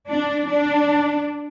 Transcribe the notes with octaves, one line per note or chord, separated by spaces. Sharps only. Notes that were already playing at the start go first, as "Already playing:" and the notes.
D4
D4